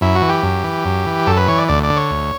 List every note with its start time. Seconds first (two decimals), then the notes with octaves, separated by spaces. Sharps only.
0.01 F#2 E4
0.15 F#4
0.22 E3
0.29 G4
0.43 F#2
0.64 E3
0.85 F#2
1.06 E3
1.27 F#2 A4
1.37 B4
1.48 E3 C#5
1.58 D5
1.68 D2 D5
1.83 D5
1.90 D3
1.97 C#5
2.11 D2